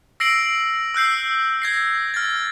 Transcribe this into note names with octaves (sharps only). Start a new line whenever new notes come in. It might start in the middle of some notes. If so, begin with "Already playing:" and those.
E6 A#6 C7 D7 F#7
E6 F#6 G6 C7
G#6 A#6 C7
F6 A6